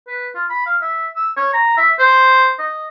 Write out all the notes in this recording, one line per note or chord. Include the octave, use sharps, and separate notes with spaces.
B4
F4
B5
F5
E5
E6
C#5
A#5
E5
C5
D#5